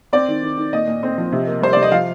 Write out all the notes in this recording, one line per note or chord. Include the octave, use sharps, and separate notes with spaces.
C4 D5
D#3
D#3
D#3
A#2 D#5
A#2
C4
F3
C3
A#3
G3 C5
C3 D5
D#5
F3 F5